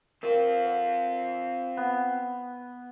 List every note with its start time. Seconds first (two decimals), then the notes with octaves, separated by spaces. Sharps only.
0.23 C4 F4 A#4 F5
0.65 C5 F#5
1.77 B3